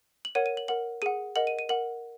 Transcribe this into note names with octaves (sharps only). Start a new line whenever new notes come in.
F#7
A#4 C#5 F#5 D#7
D#7
F#7
A#4 F#5 F#7
G#4 F#5 D#7
A#4 D#5 F#5 F#7
D#7
D#7
A#4 F#5 F#7